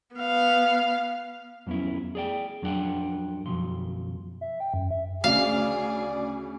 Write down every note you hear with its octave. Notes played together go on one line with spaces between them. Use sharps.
B3 F5
F2 F#3 B3 C#4 E4
G#4 D5 G5
F2 F#3 D4 F#4 F#5 G5
B1 F#2 F3 C6
E5
G5
F#2
E5
D2 C#3 G#4 D5 F5